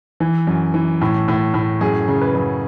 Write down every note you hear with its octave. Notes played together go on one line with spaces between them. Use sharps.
E3
F#2
E3
A2
A2
A2
F#2 G#4
C#3
B4
F#2